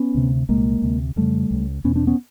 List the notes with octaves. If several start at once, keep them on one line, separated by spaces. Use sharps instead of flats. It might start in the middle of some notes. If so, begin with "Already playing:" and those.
Already playing: B3 C#4
D2 C3
C2 A#2 G#3 A#3
D2 C3
F2 C#3 G3 A3
C#2 C#3
E2 B2 B3 C#4
C4 D4
B3 C#4